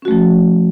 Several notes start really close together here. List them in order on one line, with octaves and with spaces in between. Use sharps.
C#4 F#4 A3 F3